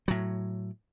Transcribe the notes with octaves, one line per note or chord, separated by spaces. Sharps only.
A2 F#3